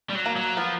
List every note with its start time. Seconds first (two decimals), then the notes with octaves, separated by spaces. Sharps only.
0.10 G3
0.15 F#3
0.26 A#3
0.36 F#3
0.57 F3 B3